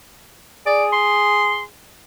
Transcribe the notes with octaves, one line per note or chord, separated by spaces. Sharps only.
G#4 D5
C6